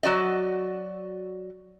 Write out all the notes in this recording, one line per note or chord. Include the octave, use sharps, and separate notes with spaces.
F#3 F#4 D5 D#5